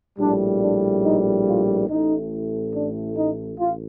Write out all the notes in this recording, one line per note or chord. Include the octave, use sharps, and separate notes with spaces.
A#1 A2 G3 D4
D4
D#4
F4
A1 A2 A3 D#4
D4
D#4
A1 F4